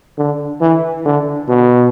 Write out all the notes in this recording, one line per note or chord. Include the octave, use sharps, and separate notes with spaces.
D3
E3
D3
B2